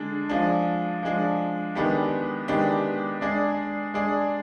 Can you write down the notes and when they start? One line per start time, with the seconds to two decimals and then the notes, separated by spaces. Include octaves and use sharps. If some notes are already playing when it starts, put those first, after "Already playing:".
Already playing: D3 G#3 D4
0.29 F3 G#3 D4
1.03 F3 G#3 D4
1.75 D#3 G#3 B3 D4 G4
2.48 D#3 G#3 B3 D4 G4
3.21 G#3 D4 G#4 D5
3.94 G#3 D4 G#4 D5